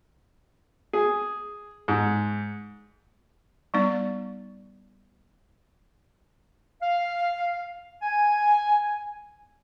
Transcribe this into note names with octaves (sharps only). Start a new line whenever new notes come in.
G#4
G#2
G3 B3 D#4 D5
F5
G#5